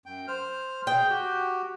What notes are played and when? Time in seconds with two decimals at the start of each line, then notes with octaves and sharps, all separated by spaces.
0.06 F#2 G5
0.28 C5 F6
0.87 G#4 G5
1.10 F#4 G4